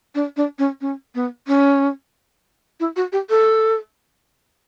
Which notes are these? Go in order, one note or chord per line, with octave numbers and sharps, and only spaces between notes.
D4
D4
C#4
C#4
B3
C#4
E4
F#4
G4
A4